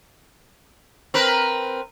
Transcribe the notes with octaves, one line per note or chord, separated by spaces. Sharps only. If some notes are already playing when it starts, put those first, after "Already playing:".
C4 A#4 B4